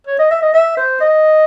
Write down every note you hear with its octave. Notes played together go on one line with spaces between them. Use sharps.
C#5
D#5
E5
D#5
E5
C5
D#5